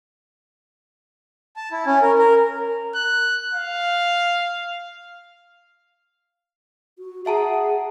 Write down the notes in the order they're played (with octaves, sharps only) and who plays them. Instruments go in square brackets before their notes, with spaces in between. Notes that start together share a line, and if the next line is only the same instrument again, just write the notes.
[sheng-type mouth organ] A5
E4
C#4
A#4
A#4
[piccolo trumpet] F#6
F5
[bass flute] F#4
[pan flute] G#4 [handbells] E5 A5 A#5 [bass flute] F#5